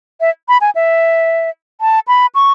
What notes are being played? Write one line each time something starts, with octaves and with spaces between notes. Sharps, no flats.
E5
B5
G#5
E5
A5
B5
C#6